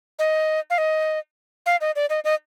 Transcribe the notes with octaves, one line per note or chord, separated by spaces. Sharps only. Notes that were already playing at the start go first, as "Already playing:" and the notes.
D#5
F5
D#5
F5
D#5
D5
D#5
D#5